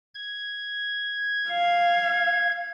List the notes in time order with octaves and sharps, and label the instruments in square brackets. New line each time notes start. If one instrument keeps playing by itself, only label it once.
[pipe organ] G#6
[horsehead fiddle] F5